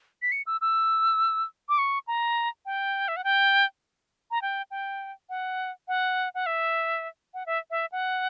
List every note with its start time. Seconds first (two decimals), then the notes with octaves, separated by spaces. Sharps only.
0.22 B6
0.32 C#7
0.47 E6
0.61 E6
1.69 D6
1.78 C#6
2.07 A#5
2.66 G5
3.08 E5
3.16 F#5
3.24 G5
4.31 A#5
4.42 G5
4.71 G5
5.29 F#5
5.88 F#5
6.35 F#5
6.46 E5
7.34 F#5
7.46 E5
7.70 E5
7.92 F#5